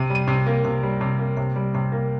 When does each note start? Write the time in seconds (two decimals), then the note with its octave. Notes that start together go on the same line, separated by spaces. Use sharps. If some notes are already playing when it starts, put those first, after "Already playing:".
Already playing: C3 D#7
0.10 G3 D#7
0.28 C3
0.47 A#3
0.65 C3
0.83 G3
1.01 C3
1.19 A#3
1.37 C3
1.56 G3
1.75 C3
1.92 A#3